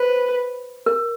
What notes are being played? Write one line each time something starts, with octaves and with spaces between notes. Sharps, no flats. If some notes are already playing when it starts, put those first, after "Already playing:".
Already playing: B4 C5
A#4